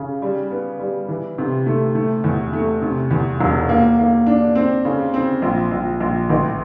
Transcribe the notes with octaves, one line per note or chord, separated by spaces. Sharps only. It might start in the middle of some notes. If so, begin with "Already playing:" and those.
Already playing: C#3
G3
B3
G3
E3
C3
A3
A3
E2
A3
C3
E2
E1
A#3
A#3
D4
C4
C#3
C4
A#1
A#1
A#1
A1